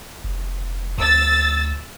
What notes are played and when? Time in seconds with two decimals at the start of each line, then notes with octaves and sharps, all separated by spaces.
0.24 F1
0.98 D2 E6 A6